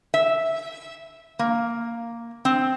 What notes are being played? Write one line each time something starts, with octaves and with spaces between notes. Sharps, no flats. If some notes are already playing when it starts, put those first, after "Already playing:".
E5
A#3
C4